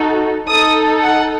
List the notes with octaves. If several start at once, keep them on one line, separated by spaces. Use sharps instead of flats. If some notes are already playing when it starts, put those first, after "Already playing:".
Already playing: D#4 F#4 A4
D#4 A4 D#6
F#5